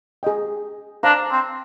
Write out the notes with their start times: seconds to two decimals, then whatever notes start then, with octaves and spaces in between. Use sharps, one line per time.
0.23 G#4 D#5 G5
1.03 D4 C5 F5 A#5
1.31 C4